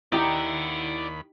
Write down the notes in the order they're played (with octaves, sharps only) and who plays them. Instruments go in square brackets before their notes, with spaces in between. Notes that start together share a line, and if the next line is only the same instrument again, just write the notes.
[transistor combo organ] D#2 B5 [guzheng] D#4 G4 [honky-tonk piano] E4 [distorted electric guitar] D5 F#5